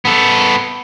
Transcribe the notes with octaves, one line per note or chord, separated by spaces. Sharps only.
B3 A4